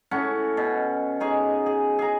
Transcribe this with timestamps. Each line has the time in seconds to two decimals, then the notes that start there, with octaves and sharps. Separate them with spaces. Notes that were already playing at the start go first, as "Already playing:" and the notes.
0.11 A2 C#4 F#5 C#6
0.57 B2
1.20 D#4 G#4 C#5
1.66 G#4
1.99 G#4 A#5